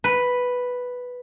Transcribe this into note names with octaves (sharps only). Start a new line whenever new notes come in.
B4